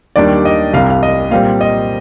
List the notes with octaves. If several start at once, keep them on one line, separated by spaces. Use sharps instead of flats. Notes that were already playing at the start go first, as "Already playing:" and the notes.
D#2 D#3 G3 D4 D5
D#5
C2 C3 G3 F5
F5
D#5
A#2 G3 C4 F5
D#5